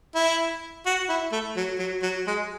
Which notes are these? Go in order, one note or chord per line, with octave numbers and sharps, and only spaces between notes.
E4
F#4
E4
A3
F#3
F#3
F#3
G#3